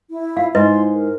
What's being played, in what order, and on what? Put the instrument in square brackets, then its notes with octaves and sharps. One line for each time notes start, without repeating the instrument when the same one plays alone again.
[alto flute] E4
[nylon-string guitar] F4 [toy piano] F5
[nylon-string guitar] G#2 [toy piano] E4 B4 D#5 [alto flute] C6
[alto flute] A#4